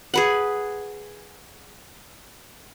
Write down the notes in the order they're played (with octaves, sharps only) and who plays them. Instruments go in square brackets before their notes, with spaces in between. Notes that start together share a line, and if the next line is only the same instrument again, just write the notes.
[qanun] G#4 B4 F#5